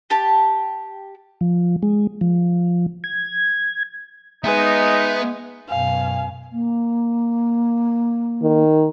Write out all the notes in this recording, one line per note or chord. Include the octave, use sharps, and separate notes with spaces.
G4 A5
F3
G#3
F3
G#6
G#3 B3 D#4 B4 E5
F#2 B2 F5 G#5
A#3
D#3